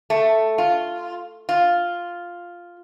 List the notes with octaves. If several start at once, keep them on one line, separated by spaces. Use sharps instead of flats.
A3
F4
F4